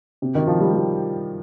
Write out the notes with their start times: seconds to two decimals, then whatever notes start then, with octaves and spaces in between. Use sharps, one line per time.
0.22 C3
0.35 D#3
0.47 F3
0.61 G3
0.73 G3